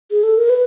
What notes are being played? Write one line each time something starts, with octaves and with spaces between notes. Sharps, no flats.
G#4
A4
A#4
B4